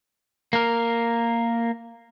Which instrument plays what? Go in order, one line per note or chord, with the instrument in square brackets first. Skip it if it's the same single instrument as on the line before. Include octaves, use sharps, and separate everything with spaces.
[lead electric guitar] A#3 A#4